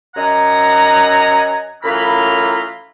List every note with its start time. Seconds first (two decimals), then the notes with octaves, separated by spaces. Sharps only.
0.15 F#2 D#5 F#5 G#5 A#5
1.83 F#2 A2 E3 F4 A#5 B5